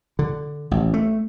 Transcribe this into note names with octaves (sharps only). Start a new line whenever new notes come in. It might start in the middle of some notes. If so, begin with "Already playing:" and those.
D3
A1
A3